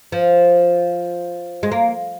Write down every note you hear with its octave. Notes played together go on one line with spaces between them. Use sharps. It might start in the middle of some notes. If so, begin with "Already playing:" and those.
F3
G#3
A#3